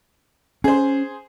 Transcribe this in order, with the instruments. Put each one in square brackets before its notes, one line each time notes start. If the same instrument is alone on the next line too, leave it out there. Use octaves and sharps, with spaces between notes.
[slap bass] C#4 [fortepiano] G#4 C5